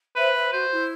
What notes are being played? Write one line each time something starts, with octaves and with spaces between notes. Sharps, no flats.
B4 C5 E5
C5 E5
F#4 C5
E4